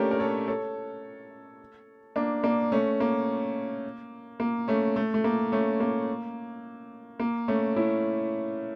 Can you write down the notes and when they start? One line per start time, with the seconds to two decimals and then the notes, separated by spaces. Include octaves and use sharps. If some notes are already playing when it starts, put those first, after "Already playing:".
Already playing: A3 A#3 C#4 D4 G4 A#4
0.11 A#4
0.20 A4 C#5
0.48 A4 C#5
2.16 A#3 D4
2.44 A#3 D4
2.72 A3 C#4
3.00 A#3
4.40 A#3
4.68 A3 C#4
4.96 A3
5.14 A3
5.24 A#3
5.52 A3 C#4
5.80 A#3
7.20 A#3
7.48 A3 C#4
7.76 C#4 E4